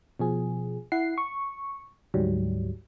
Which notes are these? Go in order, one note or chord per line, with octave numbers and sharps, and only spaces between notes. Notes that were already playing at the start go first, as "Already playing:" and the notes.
B2 F3 G#4
E4 F#5 C7
C#6
D2 G#2 F#3 G3